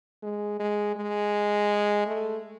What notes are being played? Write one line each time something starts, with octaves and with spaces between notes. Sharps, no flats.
G#3
G#3
G#3
A3